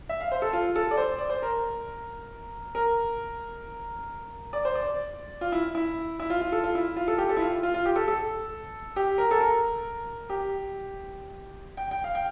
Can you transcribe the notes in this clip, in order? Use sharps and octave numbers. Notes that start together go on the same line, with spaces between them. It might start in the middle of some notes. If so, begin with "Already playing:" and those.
E5
F5
C5
A4
F4
A4
D5
C5
D5
C5
A#4
A#4
D5
C5
D5
F4
E4
E4
E4
F4
F4
A4
F4
E4
F4
A4
G4
A4
E4
F4
F4
F4
G4
A4
A4
G4
A#4
A4
A#4
G4
G5
G5
F5
G5